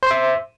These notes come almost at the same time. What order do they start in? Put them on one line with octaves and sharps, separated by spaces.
C5 C6 E5